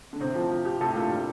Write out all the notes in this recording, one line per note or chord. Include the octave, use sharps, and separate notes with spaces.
D3
A2 C3 C4
F3
F3
G4
A2 C3 A4
G2 A#2 F4
G3